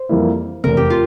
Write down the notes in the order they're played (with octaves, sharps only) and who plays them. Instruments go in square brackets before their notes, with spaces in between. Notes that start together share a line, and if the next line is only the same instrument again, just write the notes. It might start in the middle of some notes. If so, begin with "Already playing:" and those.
Already playing: [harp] C5
[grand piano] F2 E3 G3 A#3 E4
[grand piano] F1 E2 C3 [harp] A#4
[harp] G4
F4